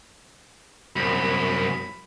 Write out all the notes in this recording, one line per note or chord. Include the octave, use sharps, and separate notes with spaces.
C2 F#2 B5